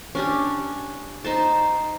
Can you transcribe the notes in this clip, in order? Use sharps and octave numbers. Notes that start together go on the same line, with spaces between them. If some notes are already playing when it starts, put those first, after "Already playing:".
C#4 D4 G4
D#4 C5 A5